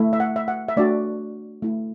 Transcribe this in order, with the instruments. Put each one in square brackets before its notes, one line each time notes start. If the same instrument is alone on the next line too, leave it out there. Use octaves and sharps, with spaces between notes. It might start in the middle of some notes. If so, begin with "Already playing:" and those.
Already playing: [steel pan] A3 E4
E5
F#5
E5
F#5
E5
A3 D4 F#4 D5
A3 E4